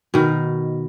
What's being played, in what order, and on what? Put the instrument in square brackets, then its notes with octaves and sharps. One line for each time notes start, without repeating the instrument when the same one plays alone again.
[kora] B2 D#3